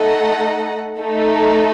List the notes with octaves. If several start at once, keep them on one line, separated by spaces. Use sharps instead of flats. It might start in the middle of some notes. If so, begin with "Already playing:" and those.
Already playing: A3 D#4 A4 D#5 F#5
A3 D#4 A4